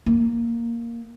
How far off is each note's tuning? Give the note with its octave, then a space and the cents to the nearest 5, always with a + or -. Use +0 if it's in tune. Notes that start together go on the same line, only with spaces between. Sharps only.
A#3 +0